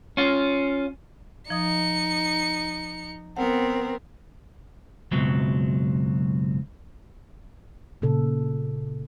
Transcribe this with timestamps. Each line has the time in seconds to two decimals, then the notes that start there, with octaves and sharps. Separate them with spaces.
0.17 C#4 F4
1.50 F3 D#4 D#5 D#6 C#7
3.37 B3 C4 A#4 F#5
5.11 C#2 F#2 B2 F#3 C4
8.02 A#2 C#3 A4